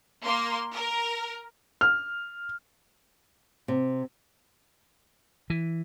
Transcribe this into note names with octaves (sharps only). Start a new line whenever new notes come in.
A#3 C6
A#4
F6
C3
E3